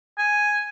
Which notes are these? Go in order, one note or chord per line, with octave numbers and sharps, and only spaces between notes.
G#5